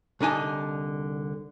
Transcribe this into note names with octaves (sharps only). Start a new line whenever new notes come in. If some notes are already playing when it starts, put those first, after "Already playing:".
C2 D3 D#4 G#5 A5